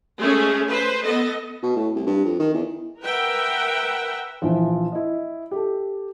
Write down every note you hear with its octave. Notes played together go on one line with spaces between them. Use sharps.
G#3 A3 C#4 G#4
B4 C5
B3 A4 D#5
B2
A2
C2
G2
F2
D#3
E2
A#4 B4 E5 F#5 G5
A#1 E3 F3
E4 D#5
G4 A4